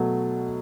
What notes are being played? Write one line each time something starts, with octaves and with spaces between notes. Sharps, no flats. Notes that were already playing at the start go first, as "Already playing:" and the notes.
Already playing: B2 F#3 A3